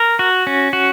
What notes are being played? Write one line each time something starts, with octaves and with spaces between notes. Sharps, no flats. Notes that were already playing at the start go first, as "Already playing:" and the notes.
Already playing: A#4
F#4
C#4
F#4